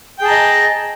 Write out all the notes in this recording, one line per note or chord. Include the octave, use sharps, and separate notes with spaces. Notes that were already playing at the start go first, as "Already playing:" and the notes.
G#4 D#5 G5 A5 A#5